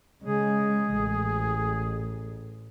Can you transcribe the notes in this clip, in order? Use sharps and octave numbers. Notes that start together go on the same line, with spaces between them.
C#3 G#3 G#4
A1